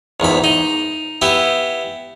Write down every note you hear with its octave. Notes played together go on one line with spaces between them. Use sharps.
A#1 E2 G#2 B5
D#4
B3 E4 G4